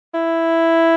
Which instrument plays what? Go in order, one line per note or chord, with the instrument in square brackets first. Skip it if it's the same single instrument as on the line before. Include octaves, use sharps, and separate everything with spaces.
[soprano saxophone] E4